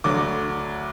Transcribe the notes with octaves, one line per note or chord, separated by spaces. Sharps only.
D2 D3 F#3 D6